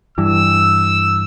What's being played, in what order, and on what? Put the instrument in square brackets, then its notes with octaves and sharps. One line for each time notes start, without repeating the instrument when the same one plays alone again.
[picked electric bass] G2 E3 [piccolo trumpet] E6